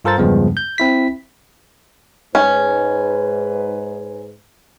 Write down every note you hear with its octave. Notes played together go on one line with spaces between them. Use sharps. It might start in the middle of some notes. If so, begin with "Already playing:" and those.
G2 F4 A4 A#4 C5 A6
E2 G2 C#3 F3 G#3 B3
G6
C4 E4 B6
G#2 C#4 B4